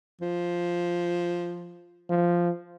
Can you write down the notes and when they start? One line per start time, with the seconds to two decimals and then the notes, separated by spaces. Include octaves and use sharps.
0.21 F3
2.09 F3